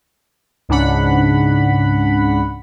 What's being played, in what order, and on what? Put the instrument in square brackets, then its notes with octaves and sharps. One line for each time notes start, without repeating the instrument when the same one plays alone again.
[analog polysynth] C#2 G#2 C#3 D4 F#5 B5